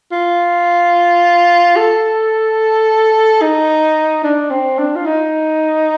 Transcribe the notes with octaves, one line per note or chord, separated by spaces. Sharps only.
F4
A4
D#4
D4
C4
D4
F4
D#4